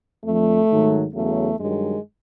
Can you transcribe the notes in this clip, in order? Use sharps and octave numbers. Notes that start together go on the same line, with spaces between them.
F2 D3 F3 A3
G#2 D#3 F#3
E2 C#3 F#3 A3
G2 D#3 F#3 G#3